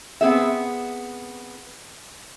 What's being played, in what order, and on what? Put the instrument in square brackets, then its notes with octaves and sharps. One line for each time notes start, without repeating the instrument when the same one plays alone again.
[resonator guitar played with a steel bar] B3 C4 G#4 E5